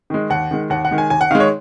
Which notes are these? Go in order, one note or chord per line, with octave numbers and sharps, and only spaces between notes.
D#3 G#3
D#2 F#5
D#3 G#3
D#2 F#5
F#5
D#3 G#3
G#5
D#2 G#5
F#5
D#3 G#3 F5
C#5